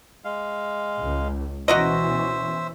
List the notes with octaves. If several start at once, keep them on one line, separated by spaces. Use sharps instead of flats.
G#3 F5
C#2
B2 E3 C#4 F#4 A#4 C5 D#5 E5